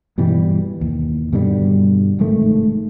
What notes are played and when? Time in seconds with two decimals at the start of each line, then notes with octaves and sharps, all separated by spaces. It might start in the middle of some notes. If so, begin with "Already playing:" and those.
0.18 G2 B2 E3 G3
0.81 D#2
1.33 G2 B2 D3 G3
2.19 F1 G#2 D#3 A3